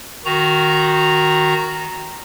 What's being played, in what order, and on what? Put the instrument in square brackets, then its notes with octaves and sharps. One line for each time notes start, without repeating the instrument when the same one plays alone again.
[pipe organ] D#3 F#4 A#5